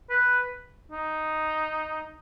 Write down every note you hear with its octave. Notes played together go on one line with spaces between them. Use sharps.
B4
D#4